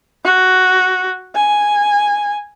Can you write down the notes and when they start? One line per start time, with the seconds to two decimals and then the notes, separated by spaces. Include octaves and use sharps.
0.24 F#4
1.35 G#5